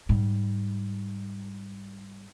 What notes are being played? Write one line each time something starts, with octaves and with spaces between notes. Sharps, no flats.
G#2 G3